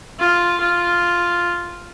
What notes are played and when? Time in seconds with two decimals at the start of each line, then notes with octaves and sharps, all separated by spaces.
0.20 F4
0.60 F4